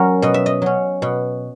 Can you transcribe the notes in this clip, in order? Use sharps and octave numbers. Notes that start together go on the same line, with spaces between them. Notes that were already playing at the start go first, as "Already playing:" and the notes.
Already playing: F#3 C#4 A#4
B2 D#5
E5
D#5
F#3 C#4
B2